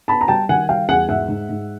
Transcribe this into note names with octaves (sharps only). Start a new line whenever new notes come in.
B3 A5 B5
A#5
G3 G5 A5
D#3 F#5 G#5
G3 F5 G5
E2 F#5 G#5
G#2 E5 F#5
G#2
G#2